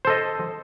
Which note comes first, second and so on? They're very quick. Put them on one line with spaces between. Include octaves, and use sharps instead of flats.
C5 A4 D#5